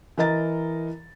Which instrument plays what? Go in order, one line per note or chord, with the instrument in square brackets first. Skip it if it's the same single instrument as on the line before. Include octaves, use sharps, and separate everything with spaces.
[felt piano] E3 A#4 D#5 A#5 A6